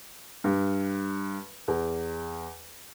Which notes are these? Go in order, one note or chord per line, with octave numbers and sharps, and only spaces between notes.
G2
E2